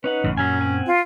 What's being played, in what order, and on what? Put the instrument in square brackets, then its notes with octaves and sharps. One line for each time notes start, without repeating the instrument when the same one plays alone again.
[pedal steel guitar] C#4 D#4 F#5 [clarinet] B4
[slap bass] A1 F#2 C#3
[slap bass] F#2 A#2 [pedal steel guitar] F#3 G#5 [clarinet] C#4
[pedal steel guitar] C4 F#5 G#5
[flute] F4